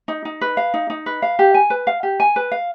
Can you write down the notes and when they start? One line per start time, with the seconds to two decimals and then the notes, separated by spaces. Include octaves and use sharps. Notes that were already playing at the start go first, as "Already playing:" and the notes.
0.08 D#4
0.25 D#4
0.41 B4
0.57 F5
0.74 D#4
0.90 D#4
1.06 B4
1.22 F5
1.39 G4
1.54 G#5
1.70 B4
1.87 F5
2.03 G4
2.20 G#5
2.36 B4
2.52 F5